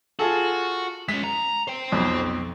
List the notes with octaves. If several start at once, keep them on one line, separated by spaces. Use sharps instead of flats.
F4 F#4 G#4 A4
G#3 C#4 B6
A#5
C5 G5
B1 F2